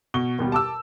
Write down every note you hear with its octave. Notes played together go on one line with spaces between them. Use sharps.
B2 C#6 G7
D#2 B2 G3
A5 D6 E6